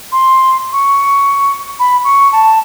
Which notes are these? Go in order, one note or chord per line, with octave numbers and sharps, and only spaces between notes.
C6
C#6
B5
C#6
A5